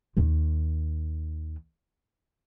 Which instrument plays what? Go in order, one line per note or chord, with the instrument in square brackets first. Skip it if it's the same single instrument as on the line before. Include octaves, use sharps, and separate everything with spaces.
[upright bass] D#2 D#3